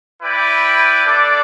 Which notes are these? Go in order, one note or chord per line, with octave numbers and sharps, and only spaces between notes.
E4 B4 D5 G5
D4 A4 D5